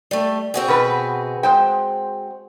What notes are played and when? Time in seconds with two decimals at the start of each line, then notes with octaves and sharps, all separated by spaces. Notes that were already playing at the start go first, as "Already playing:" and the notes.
0.11 G3 A3
0.54 C4 F#4 G#4
0.68 B2 B4
1.43 G#3 C5 G5